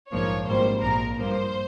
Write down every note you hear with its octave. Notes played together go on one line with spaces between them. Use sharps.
A#1 G#2 F3 A#3 C#5
G#1 G#2 G3 A#3 C5
A#1 G#2 F3 A#3 A#4
G2 F3 A#3 C5